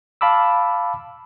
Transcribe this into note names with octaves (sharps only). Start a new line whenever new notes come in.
F5 A5 B5 D6 E6